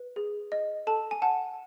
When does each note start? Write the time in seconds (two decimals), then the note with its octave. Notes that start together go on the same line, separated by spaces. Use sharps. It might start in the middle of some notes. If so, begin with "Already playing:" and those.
Already playing: B4
0.16 G#4
0.52 D#5
0.87 A4 A5
1.11 G#5
1.22 F#5 A5